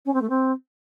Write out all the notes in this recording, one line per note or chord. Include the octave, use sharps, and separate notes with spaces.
C#4
C4
A3
C4